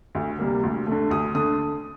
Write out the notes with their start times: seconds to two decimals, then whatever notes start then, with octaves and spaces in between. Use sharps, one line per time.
0.15 D2
0.39 C3 G3 A#3
0.63 D2
0.87 D3 A3
1.10 D2 D#6
1.34 D3 A3 D#6